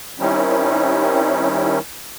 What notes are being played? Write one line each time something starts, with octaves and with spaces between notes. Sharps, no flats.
D#3 G3 C4 C#4 D#4 E4